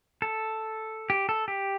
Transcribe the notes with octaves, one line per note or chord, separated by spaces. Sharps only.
A4
G4
A4
G4